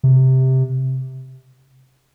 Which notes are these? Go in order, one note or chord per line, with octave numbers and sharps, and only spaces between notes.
C3